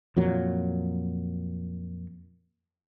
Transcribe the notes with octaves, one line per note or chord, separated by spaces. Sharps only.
F2 A#2 F#3